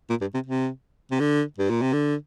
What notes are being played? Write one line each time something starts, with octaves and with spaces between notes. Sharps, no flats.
A#2
G2
C3
C3
C3
D3
G2
A#2
C3
D3